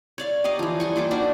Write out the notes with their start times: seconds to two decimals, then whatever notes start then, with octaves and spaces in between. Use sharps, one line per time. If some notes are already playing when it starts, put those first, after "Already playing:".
0.18 C#5 D5 F5
0.44 G4 A#4 D#5 F5
0.59 E3 F3
0.80 G3 G#5 C#6
0.96 A#3 F4 C5 D6
1.11 D4 D#4 F#4 A#4